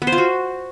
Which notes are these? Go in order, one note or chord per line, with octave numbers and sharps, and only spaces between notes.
B3
C5
F4
F#4